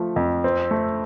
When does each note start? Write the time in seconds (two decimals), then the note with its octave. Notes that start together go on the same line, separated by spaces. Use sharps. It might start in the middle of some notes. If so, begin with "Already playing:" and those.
Already playing: F3 A3
0.16 F2
0.44 C4
0.71 A3